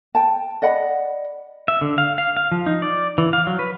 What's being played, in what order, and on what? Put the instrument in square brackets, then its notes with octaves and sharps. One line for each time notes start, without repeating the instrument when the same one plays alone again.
[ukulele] G5 A5
D5 D#5 F#5 B5
[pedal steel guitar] E5
D3
F5
F5
F5
F3
D#4
D5
E3
F5
F#3
B4